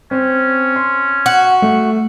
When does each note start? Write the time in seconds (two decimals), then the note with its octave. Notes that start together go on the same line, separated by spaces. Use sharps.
0.11 C4 C#4
0.76 C6
1.26 F#4
1.62 A3